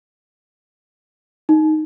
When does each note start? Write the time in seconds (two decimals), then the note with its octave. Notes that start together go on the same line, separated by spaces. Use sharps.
1.49 D#4